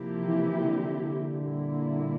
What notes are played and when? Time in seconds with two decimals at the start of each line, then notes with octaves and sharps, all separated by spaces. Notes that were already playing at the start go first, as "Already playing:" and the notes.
Already playing: C3 F3 A#3 E4 G4
0.24 E3
0.63 D3
1.02 D3
1.39 A#2 G3 A#3 E4